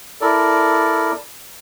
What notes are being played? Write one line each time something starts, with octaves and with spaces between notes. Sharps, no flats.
E4 A4 A#4 D5